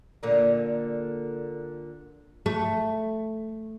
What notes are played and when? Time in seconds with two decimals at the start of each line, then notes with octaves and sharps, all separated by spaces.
0.23 A#2 D3 A#3
2.46 A3